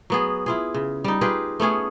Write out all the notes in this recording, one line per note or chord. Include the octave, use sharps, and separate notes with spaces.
F#3 B3 G#4
E4 F4 G#4
C#3
G3 D#4
F4 G4 G#4 B4
A3 B3 C#4 G#4